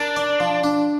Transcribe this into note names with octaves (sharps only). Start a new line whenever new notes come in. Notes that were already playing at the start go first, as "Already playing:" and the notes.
Already playing: D4 A#4
D5
F3
D4